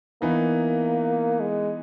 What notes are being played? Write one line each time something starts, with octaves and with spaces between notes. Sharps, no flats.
E3 A#3 B3 D#4
G#3